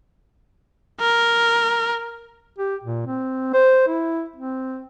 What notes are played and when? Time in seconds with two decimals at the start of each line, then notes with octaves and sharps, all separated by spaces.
1.00 A#4
2.59 G4
2.83 A#2
3.06 C4
3.53 C5
3.88 E4
4.36 C4